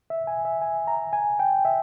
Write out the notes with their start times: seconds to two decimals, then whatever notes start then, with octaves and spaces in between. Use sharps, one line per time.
0.10 E5
0.27 G#5
0.45 E5
0.62 G#5
0.87 A#5
1.13 G#5
1.39 G5
1.65 E5